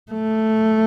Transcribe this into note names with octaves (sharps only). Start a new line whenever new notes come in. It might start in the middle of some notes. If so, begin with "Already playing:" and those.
A3